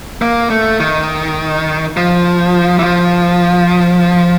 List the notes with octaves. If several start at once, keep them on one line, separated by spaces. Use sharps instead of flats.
A#3
A3
D#3
F3
E3
F3